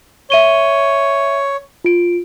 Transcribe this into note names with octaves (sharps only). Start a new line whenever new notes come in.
C#5 E5 D#7 G7
F4 D7